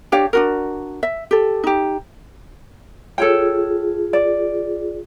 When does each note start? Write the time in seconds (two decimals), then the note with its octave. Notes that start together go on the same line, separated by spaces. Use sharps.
0.12 D4 G4 C#5 F5
0.33 D4 F#4 A#4
1.03 E5
1.31 G4 A4
1.64 D#4 G4
3.18 F4 G#4 A4 C#5 G5
4.13 D5